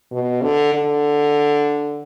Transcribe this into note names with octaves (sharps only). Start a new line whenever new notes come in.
B2
D3
D3